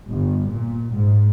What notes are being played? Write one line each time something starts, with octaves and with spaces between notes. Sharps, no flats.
G1
A#2
G#2